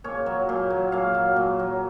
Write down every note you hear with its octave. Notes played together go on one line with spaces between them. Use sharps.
A#2 C#5
F#3
A#2
F#3
A#2 F5
F#3
A#2
F#3